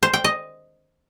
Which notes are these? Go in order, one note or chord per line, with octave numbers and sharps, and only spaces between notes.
C5
G5
D#5